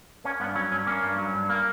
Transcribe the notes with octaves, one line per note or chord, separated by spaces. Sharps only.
A#3 C#4
G2 B3
F#3 C#4
G2 C#4
A#3 C#4
G2
F#3
G2
A#3